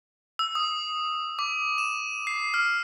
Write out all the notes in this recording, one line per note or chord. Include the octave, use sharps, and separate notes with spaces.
E6
D#6
D6
E7
C7
F6